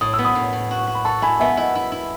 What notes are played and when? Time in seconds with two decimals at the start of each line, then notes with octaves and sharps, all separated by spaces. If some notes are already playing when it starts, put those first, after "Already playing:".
0.01 A2 D#6
0.13 E6
0.18 B3
0.25 B5 D#6
0.35 A2
0.53 A2
0.71 F#4
0.87 F#4
0.95 B5
1.05 A4 A5 C#6
1.22 E4 G#5 B5
1.40 B3 E5 G#5
1.57 E4 D#5 F#5
1.75 E4
1.92 E4